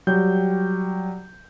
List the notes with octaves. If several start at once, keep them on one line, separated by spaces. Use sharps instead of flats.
F#3 G3 G5 G6